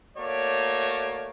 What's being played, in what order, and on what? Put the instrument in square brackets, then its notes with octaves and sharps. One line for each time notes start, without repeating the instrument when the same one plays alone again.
[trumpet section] A3 A#3 F#4 C#5 D5